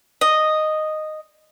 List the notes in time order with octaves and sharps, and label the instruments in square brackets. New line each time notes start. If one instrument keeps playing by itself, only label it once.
[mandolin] D#5